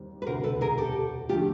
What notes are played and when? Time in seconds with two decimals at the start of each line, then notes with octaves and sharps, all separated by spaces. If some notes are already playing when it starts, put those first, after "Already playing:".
Already playing: D#2 D#3 G3 C4
0.22 B4
0.26 E1 D2 C3 A#4 C5
0.43 A4 B4
0.61 G#4 A#4
0.78 G4 A4
1.29 D3 F3 A3 F4 G4